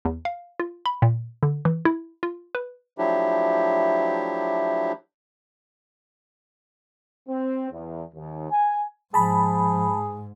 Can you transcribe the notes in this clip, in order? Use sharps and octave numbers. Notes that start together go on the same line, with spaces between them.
E2
F5
F4
B5
A#2
D3
E3
E4
F4
B4
F3 F#3 A3 D4 E4 G4
C4
E2
D#2
G#5
G#2 F3 G#4 A5 B5